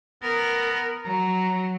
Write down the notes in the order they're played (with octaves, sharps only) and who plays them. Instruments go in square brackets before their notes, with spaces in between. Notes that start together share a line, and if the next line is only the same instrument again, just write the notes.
[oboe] B3 [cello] A#4
[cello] F#3 [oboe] A#5